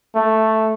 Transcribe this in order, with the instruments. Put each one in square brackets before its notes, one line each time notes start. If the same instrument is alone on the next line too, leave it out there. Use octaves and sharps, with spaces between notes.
[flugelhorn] A3